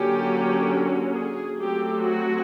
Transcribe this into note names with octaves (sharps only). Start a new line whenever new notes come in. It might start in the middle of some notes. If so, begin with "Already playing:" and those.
Already playing: D3 F#3 A#3 C#4 G4
G#4
F#3 A3 C4 G4
F#4